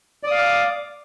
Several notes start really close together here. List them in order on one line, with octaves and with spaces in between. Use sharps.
D5 D#6 F5 D6